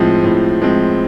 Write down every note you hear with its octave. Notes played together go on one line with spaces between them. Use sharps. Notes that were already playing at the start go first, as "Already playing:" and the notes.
Already playing: A2 F3 G#3 C4
A2
F3 G#3 C4